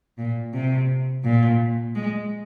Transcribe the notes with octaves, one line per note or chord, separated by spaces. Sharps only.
A#2
C3
A#2
G#3